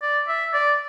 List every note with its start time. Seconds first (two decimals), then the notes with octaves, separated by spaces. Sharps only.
0.02 D5
0.28 E5
0.54 D5